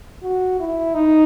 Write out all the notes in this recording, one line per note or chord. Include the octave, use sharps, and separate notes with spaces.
F#4
E4
D#4